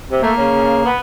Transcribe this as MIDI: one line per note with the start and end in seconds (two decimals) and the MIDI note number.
0.11 0.21 48
0.22 0.31 57
0.22 0.89 58
0.37 0.79 49
0.84 0.99 59